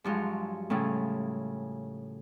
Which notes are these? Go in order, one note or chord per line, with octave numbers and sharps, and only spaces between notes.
G2 F3 F#3 G#3
A2 C#3 F3 G3